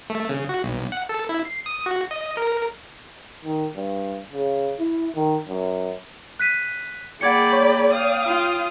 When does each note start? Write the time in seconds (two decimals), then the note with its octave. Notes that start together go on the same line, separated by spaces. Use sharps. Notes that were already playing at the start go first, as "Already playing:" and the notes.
0.10 A3
0.29 C#3
0.49 F#4
0.64 B1
0.92 F#5
1.09 A4
1.29 E4
1.45 C7
1.66 D#6
1.86 F#4
2.11 D#5
2.37 A#4
3.44 D#3
3.75 G2
4.33 C#3
4.79 E4
5.15 D#3
5.49 F#2
6.40 F#6 B6 D#7
7.21 A#3 G#4 D5 F#5 G5 B5 G#6 C#7
7.52 C#5 C#6
7.92 F5 G5 D#6
8.26 F4